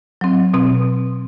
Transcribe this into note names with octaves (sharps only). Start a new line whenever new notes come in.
F#3 C4
B2 C4